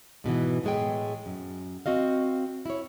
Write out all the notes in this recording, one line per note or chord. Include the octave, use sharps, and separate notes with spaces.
G#2 B2 D3 E3
A2 G#3 G5
F#2
C4 F#4 D#5 F5
E4 C#5